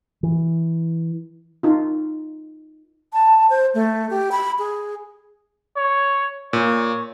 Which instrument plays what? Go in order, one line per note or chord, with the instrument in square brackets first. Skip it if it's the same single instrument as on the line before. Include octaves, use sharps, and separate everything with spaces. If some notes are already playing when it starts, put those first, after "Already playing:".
[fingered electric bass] E3
[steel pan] D#4 F4
[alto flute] A5
C5
A3
G4
B5
G#4
[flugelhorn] C#5
[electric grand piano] A#2 [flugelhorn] C#5